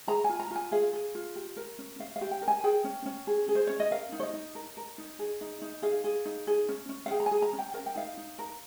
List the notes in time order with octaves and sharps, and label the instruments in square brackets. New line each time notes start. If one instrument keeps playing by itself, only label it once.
[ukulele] G#4 A#5
G#5
F4
A#5
F4 G#5
G#4 F5
G#4
F4
G4
A#4
C#4
C#4 F5
F5
G4
G5
A#4
G#5
G#4 G5
C#4
C#4
G#4
G#4
C5
C#4 C#5
D#5
A#4 F5
D#4
C#5
D#5
D#4
A#4
A#4
D#4
G#4
D#4
D#4
G#4 F5
G#4
D#4
G#4
C#4
C#4
F5
G#4 G5
A#5
G#5
G#4
A#5
C#4
G5
A#4 F5
G5
D#4 F5
D#4
A#4